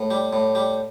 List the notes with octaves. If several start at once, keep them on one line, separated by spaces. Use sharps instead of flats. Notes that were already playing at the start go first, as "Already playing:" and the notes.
Already playing: A2
G3
A2
G3